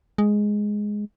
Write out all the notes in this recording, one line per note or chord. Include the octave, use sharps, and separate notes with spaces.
G#3